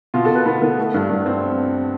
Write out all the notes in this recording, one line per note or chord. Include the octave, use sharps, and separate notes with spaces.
B2 F4
A4
B2
B4
B3
B3
A3
G2
G2
C4